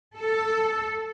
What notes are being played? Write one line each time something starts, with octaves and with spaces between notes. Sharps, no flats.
A4